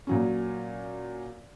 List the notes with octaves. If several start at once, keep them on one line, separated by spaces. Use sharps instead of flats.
A#2 F#3 C#4